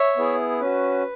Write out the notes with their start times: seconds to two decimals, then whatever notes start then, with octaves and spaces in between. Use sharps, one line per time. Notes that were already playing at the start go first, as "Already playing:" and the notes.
Already playing: C#5 E5
0.17 B3 E4 G#4
0.60 C#4 F#4 B4